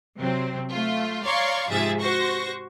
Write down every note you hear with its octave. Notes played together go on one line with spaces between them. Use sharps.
C3 F#3 C4
A3 F4
C#5 D5 F5 A#5 C6 C#6
G#2 C3 F3 G#4 E5 A6
F#4 C5 C#6 A#6